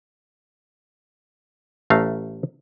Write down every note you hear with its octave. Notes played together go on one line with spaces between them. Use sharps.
A1 A3 F5 A#5